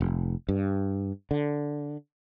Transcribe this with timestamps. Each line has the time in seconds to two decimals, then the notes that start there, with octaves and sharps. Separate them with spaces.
0.01 F1
0.49 G2
1.31 D3